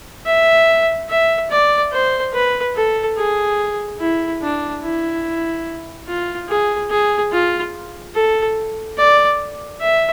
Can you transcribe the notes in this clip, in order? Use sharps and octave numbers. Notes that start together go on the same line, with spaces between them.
E5
E5
D5
C5
B4
A4
G#4
E4
D4
E4
F4
G#4
G#4
F4
A4
D5
E5